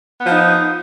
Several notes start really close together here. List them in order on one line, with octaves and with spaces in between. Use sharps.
B3 F3 D#4